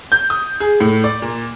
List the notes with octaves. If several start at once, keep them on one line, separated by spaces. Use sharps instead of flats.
G6
D#6
G#4
A2
D5
A#2